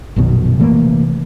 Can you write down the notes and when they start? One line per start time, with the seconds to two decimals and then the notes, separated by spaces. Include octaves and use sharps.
0.16 A#1 F#2 B2 D#3
0.59 C3 E3 A3 A#3